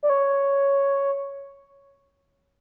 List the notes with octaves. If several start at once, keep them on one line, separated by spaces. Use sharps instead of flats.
D5
C#5